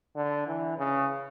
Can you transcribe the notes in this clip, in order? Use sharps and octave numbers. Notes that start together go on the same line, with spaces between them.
D3
E3
C#3